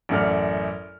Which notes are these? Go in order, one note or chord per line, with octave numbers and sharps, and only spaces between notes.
A1 F#2 A3 D5 F6